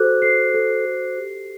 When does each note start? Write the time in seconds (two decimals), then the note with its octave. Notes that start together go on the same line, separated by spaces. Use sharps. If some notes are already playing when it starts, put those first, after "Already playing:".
Already playing: F#4 A4 C5 D6 F#6
0.22 A4 C7
0.54 A4
0.85 A4
1.18 G4